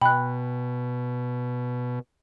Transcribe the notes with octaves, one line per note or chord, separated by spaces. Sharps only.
B2 G5 B5 F#6